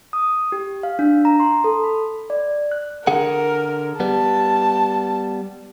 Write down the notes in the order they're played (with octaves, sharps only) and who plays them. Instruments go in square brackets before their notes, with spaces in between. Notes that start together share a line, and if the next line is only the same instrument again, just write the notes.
[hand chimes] D#6
G4
F5
D4
A#5
C6
A4
B5
D5
F#6
[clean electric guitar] D3 G#4 F#5 [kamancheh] A#4
[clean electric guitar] G3 B3 [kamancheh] A5